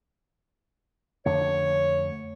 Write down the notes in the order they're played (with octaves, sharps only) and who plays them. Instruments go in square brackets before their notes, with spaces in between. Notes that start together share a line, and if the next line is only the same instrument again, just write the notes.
[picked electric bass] F2 D3 A3 [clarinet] C#5